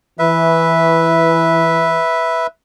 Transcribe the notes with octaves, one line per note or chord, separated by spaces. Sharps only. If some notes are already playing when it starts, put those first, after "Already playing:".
E3 B4 E5